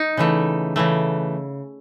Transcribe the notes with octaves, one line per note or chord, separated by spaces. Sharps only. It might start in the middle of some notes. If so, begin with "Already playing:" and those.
Already playing: D#4
C#3 E3 A3
C#3 E3 A3